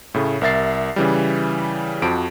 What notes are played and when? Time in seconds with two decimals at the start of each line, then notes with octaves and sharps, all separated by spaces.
0.14 A2 C#3 A3
0.41 C2 A#4 E5 A6 C7
0.96 C#3 E3 G3
2.02 F2 F3 F#4 D7